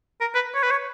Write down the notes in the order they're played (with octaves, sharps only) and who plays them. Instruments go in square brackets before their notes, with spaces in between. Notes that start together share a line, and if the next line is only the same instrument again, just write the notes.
[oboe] A#4
B4
C#5
B4
C#5